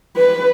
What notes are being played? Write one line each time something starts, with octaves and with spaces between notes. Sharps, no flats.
B4